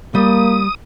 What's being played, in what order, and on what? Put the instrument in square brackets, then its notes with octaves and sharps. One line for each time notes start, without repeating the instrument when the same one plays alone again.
[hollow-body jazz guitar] G3 [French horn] A#3 [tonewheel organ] D#6